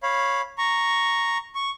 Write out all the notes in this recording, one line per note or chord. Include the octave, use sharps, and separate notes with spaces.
C#5 F5 B5
A#5 C#6
C#6